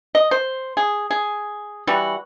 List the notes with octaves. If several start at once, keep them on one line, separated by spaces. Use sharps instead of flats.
D#5
C5
G#4
G#4
E3 G3 F#4